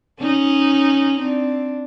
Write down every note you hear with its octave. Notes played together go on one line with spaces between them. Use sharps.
C#4 D#4
C4 D4